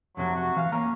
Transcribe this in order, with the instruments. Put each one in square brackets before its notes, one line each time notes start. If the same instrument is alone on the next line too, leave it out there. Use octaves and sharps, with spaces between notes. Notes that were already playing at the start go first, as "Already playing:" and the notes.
[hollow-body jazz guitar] F2 C3 [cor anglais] F#3
[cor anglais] F#4
[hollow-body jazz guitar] E3 [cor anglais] F5
[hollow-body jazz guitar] A#3 A#5 [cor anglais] C#4